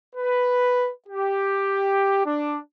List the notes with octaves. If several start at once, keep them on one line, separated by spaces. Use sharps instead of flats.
B4
G4
D4